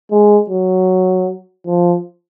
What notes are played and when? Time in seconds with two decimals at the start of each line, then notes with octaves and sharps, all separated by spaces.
0.11 G#3
0.50 F#3
1.66 F3